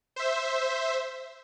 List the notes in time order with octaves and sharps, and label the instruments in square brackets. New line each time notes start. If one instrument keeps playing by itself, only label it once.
[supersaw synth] C5 E5